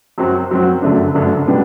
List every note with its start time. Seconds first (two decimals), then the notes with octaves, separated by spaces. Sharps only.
0.18 F#2 F#3 C4 F#4
0.51 F#2 F#3 C4 F#4
0.82 G1 F#2 D3 A3 D4
1.15 G1 F#2 D3 A3 D4
1.47 B2 G3 B3 D4